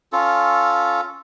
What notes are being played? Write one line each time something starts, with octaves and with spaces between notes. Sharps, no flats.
C#4 F4 A4